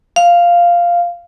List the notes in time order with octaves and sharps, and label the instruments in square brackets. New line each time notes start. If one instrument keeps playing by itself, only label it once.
[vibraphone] F5